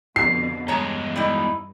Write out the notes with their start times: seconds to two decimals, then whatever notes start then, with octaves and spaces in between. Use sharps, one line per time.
0.16 F2 B2 D3 C7
0.68 E2 G2 G#3 C#5 A#5
1.16 G3 D#4 E4